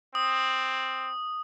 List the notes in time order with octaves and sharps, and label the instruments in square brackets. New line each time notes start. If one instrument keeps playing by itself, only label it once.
[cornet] C4 [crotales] D#6